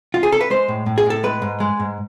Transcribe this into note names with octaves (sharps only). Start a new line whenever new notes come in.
F4
G#4
A4
B4
G#3 C5
A2
A2
G#4
A2 A4
G#3 B4
G#2
G#3
G#2